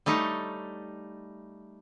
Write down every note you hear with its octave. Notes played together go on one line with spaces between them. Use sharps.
G3 A3 D#4 C#5